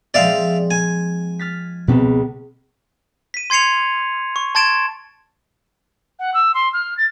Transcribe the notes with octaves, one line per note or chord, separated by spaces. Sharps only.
F3 G#3 C4 D5 E5 F5
G#5
F6 A6 B6
C#2 B2 B3 C4 B4
B6 D#7
C6 G#6 C7 C#7 F7
C#6
A5 C6 G#6 A6 D7 E7
F#5
E6
C6
F6
A6